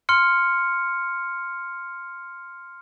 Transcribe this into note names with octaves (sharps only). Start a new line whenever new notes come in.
C6 F6 C#7